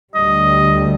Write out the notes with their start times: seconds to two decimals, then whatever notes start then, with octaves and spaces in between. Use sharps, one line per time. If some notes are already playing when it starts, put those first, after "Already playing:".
0.15 D2 D3 G3 D#5